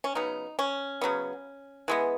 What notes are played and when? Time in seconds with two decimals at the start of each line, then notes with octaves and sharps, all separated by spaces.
0.04 C#4
0.15 C#3 F#3 B3 D#4
0.59 C#4
1.01 C#3 F#3 B3
1.88 E3 G#3 B3